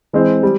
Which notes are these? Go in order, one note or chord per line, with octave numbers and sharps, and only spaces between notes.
E3 G#3 C4
G3